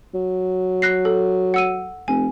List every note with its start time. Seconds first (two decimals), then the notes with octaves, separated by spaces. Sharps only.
0.14 F#3
0.82 F#6 A#6 C7
1.05 A4
1.54 F#5 E6 D#7
2.08 F1 G#5